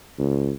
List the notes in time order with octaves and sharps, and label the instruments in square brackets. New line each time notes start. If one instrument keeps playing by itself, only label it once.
[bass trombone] C#2